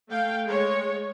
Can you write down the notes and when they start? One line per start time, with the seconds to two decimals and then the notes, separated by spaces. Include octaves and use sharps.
0.10 A3 F5 G5
0.46 G#3 C#5